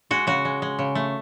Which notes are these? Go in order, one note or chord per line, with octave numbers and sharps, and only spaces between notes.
G#3 F#4
C#3 F#4
G#3
G#3
C#3
A3